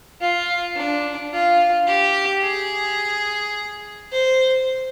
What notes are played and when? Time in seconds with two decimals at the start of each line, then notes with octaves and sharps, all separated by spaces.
0.21 F4
0.76 D4
1.32 F4
1.87 G4
2.43 G#4
4.12 C5